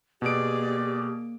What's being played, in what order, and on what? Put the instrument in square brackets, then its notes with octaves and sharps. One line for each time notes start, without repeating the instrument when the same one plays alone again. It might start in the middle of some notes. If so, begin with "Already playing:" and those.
[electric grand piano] B2 D7 [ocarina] A#3 [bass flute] G4 [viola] G#4 D5